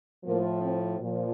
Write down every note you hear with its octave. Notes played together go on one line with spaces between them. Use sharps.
A2 F3 A#3
C4
A#2 F3